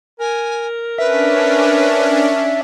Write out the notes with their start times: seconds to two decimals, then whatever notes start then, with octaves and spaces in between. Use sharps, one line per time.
0.20 A#4 G#5
0.98 C#4 D4 B4 E5